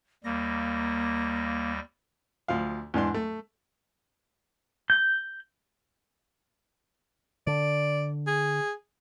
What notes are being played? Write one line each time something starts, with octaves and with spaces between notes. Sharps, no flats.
D#2 G3 A#3 A#6
D2 F3 F5
E2 G#2 D4 C6
A3
G6
D3 D5
G#4